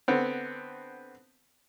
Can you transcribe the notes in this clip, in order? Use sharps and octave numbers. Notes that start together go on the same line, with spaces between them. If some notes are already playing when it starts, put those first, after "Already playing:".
D3 B3 C4